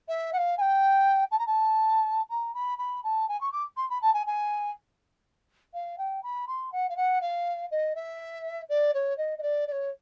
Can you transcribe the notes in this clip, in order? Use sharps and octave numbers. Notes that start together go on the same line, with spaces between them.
E5
F#5
F5
G#5
G5
A5
A#5
A5
A#5
B5
B5
A5
G#5
C#6
D6
C6
B5
A5
G#5
G#5
F5
G5
B5
C6
F#5
F5
F#5
F5
D#5
E5
D5
C#5
D#5
D#5
D5
D5
C#5